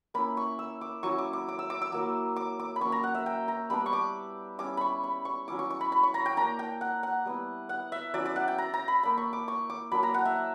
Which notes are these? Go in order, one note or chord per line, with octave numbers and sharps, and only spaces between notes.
A#3 C#4 E4 B5
C#6
E6
D6
F#3 C#4 E4 C#6
D6
D6
D6
E6
D6
E6
F#3 A#3 E4
D6
D6
B5
F#3 A#3 C#4 C#6
A#5
F#5
E5
G5
A#5
G3 B3 D4 B5
C#6
D6
G3 C#4 E4 D6
B5 C#6
B5
C#6
F#3 C#4 E4 D6
C#6
C#6
B5
B5
C#6
A#5
G5
A#3 D4 A#5
G5
F#5
F#5
G3 B3 E4
F#5
E5
F#3 C#4 E4 D5
D5
F#5
G5
A#5
A#5
B5
A#3 D4 B5
C#6
D6
C#6
D6
F#3 A#3 D4 B5
A#5
F#5
E5